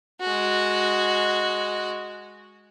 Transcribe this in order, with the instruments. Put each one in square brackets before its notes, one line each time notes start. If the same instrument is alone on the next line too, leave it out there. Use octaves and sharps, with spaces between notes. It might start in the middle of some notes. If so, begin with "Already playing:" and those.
[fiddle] G#3 F#4